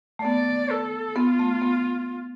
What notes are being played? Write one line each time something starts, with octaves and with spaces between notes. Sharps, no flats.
A3
B3 D5
A4
B3 F4
A3
B3